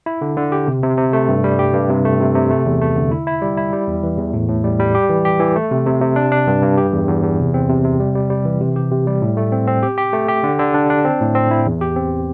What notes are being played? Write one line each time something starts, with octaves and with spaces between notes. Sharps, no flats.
E4
D3
D3
G4
C3
C3
C3
A3
G2
G3
G4
G2
C3
A3
C3
C3
A3
E2
A3
D3
E4
E4
G3
E4
G3
E2
E3
E2
A2
A2
G3
G3
G4
E3
G4
E3
A3
C3
C3
C3
D4
D4
G2
G2
G4
E2
E2
E2
C3
C4
C3
C3
G3
G3
G3
E3
C3
G4
C3
G3
A2
A3
C4
C4
G4
G4
A3
G4
D3
D3
D4
D4
C4
A2
C4
E4
E2
G4
C4